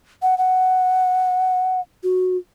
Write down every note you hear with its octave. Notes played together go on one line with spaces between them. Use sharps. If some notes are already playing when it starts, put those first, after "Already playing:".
F#5
F#5
F#4